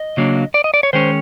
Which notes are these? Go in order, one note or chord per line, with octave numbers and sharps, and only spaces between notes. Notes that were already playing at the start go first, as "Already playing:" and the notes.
Already playing: D#5
C#3 F#3 A#3 D4
D5
D#5
D5
C#5
D#3 G#3 C#4 C5